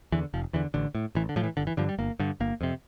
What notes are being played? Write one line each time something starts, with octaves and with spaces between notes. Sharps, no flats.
E2 D3 E3
F1 F3
E2 D3 E3
A1 D3
A2
A1 E3
D3
A2 F3
E3
G1 D3
E3
G2 D3 F3
G3
G1 A#3
G2 D3
G1 A#3
F2 C3